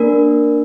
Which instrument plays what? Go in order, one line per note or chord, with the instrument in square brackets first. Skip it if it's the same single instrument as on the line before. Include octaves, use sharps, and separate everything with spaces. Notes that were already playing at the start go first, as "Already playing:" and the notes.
Already playing: [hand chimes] A#3 D4 A#4